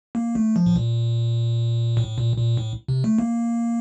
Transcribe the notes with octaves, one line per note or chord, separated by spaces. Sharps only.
A#3
A3
F3
A2
A#2
A2
A#2
A#2
A2
C3
A3
A#3